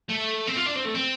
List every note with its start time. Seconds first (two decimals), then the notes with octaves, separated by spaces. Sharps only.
0.10 A3
0.48 C4
0.57 F4
0.66 D4
0.76 C4
0.85 A3
0.94 C4